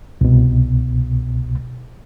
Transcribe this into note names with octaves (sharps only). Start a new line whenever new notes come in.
C2 B2